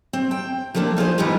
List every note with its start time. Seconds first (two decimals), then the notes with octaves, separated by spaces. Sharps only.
0.13 C4
0.31 G5
0.75 F3 A3 A#3 D4 F4
0.97 D#4 F4 G#4 C5
1.18 E3 G3 G#3 B3 D#4 F4